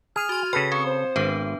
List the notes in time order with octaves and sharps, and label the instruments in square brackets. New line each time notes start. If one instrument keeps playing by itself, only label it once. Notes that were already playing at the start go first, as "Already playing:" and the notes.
[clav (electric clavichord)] G#4 [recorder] F6 [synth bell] G#6 D#7
[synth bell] F#4 C6
[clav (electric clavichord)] C#3 A4 B4 [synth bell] G5
[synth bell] C4 [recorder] C#6
[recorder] C5
[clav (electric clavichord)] G#1 [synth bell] B3 D4 B4